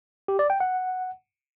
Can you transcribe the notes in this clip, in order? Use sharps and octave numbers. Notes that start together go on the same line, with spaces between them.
G4
D5
G5
F#5